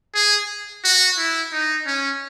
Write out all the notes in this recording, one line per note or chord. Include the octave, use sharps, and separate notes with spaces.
G#4
F#4
E4
D#4
C#4